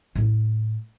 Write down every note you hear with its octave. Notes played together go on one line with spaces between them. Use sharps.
A2 E4